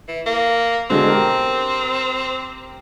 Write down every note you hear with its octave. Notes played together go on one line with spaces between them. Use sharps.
E3
A#3
B2 D3 G#3 C4
G4 A#4